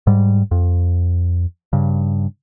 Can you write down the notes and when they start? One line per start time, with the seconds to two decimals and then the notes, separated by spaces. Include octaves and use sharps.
0.07 G#2 G3
0.51 F2
1.73 G2 C#3